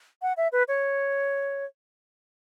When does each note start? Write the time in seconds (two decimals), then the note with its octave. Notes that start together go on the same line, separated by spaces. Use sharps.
0.22 F#5
0.37 E5
0.52 B4
0.68 C#5